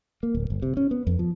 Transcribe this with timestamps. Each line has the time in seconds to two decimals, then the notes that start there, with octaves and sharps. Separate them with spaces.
0.23 A#3
0.35 D1
0.50 G1
0.62 C3
0.77 C#4
0.91 B3
1.07 F2
1.19 F3